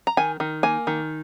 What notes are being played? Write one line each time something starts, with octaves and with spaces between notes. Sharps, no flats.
A#5
D#3 G#5
D#3
A#3 G#5
D#3